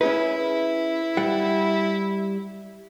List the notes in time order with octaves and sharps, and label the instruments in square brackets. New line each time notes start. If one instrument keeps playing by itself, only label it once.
[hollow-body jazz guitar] C#4 G#4 B4 [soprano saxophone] E4
[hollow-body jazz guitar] G3 F#5